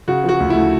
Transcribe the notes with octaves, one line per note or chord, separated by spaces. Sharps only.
C#3 F#4
F3 F#4
D2
E4
A3